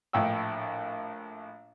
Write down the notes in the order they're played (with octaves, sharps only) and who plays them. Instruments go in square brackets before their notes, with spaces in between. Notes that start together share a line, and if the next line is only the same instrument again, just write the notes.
[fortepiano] A#1 A2 G5 E6